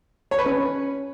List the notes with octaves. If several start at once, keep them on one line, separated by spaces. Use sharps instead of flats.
C#5
B4
C#4